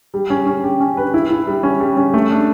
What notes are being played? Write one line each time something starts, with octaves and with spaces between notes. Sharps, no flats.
G3
C#4
C#4
G4
C#4
B4
E4
E4
G3
C#4
G3
C#4
A3
D4